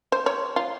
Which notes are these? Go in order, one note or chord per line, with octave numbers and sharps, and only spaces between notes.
C5
C#5
F4